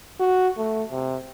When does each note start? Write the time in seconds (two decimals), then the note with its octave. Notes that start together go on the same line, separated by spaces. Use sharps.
0.20 F#4
0.58 A3
0.92 C3